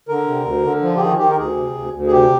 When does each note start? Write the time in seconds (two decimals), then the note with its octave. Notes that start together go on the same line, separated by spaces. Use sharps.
0.08 D3 A#4
0.27 C3
0.45 D2
0.64 D3
0.82 F3
0.96 G4
1.00 D#3 G#4
1.18 D#3 G4
1.31 A#4
1.38 D2 G#4
1.56 C3
1.75 D2
1.93 D2
2.07 G#4
2.12 C3 G4